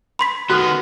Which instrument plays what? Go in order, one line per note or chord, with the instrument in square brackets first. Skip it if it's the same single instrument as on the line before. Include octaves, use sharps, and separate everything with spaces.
[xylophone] B5 C6 B6
[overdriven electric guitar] D#3 B3 [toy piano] F#4 A4 [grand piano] F6 F#6